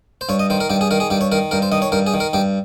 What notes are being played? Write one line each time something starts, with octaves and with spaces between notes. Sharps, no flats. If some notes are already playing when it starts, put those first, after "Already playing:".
C5
G2 C#5
D#5
D#3 C5
A#4
G2 G4
G#4
D#3 A#4
G#4
G2 G4
C#5
D#3 A#4
G2 A#4
C5
D#3 D#5
C#5
G2 A#4
G#4
D#3
A#4
G2 G4